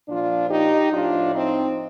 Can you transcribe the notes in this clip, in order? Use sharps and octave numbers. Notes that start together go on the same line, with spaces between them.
A#2 F3 D4 F4
D#4 G4
A2 F3 D4 F4
C4 D#4